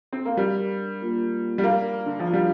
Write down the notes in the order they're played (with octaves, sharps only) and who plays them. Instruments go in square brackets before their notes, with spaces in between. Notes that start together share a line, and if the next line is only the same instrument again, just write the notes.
[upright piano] C4
A#3
[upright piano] G3 [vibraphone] D4 A#4 D5
[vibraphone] G3 A#3 F4 A#4
[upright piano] G3
[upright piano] A#3 [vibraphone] D4 A#4 D5 F5
[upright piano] D3
F3
[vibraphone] F4 D5 F5
[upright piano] G3